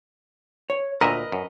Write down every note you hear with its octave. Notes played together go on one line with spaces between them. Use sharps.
C#5
D2 A#2 A#4 B4 D#5 E5 A#5
F#2